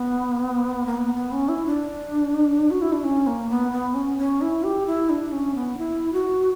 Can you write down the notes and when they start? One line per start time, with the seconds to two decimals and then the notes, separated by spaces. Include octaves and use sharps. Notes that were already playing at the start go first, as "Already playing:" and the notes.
Already playing: B3
0.86 A#3
0.97 B3
1.15 B3
1.32 C#4
1.49 E4
1.67 D4
2.71 F#4
2.82 E4
2.92 D4
3.04 C#4
3.27 A#3
3.50 B3
3.72 B3
3.95 C#4
4.19 C#4
4.41 E4
4.63 G4
4.86 E4
5.10 D4
5.32 C#4
5.55 B3
5.78 E4
6.13 F#4